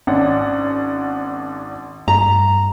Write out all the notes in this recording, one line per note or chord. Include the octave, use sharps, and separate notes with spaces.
G#1 C#4 D4 F#5
G2 A#5